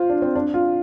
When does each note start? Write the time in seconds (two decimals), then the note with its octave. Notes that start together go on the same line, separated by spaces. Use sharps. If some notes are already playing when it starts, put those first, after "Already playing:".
Already playing: F4 C5
0.10 D4
0.22 C4
0.35 D4
0.54 F4